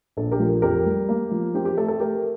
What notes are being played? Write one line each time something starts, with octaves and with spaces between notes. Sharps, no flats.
A#1 A4
G4 A#4
F3
F2 G4 A#4
G3
A#3
F3
C4 G4
G4
A3 A4
A4
A3 G4 A#4